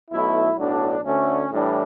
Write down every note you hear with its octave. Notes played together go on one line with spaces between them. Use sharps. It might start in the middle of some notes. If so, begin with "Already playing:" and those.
B1 B2 A3 E4
B1 A2 F#3 D4
D2 D3 A3 C#4
A2 E3 G3 D4